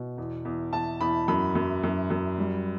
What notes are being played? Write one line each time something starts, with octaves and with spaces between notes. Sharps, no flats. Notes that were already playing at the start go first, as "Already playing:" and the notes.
Already playing: B2
E2
E2
E2 A5
E2 B5
F#2 B5
F#2
F#2
F#2
G3